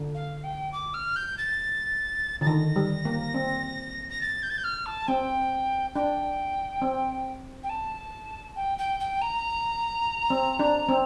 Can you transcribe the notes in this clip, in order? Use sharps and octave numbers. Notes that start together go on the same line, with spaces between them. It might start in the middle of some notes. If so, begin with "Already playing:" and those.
Already playing: D3
F5
G5
D6
F6
G6
A6
D3 A6
D#3 A#6
G3
A#3
C4
A#6
A6
G6
A6
G6
F6
A5
C4 G5
D4 G5
C4
G5
A5
G5
G5
G5
A#5
C4
D4
C4